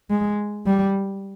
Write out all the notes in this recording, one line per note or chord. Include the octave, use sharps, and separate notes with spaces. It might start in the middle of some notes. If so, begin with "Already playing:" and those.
G#3
G3